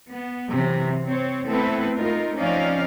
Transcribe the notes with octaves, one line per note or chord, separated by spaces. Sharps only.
B3
C3 E3 F#3
C4 C#5
A3 B3 C4 E4 A4 B4
A3 D#4 F4 A#4
F3 C4 C#4 D#4 D5 F5